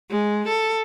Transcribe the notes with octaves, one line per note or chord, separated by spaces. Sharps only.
G#3
A4